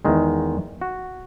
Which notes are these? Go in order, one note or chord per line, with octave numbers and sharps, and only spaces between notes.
E2 D#3 G#3
F#4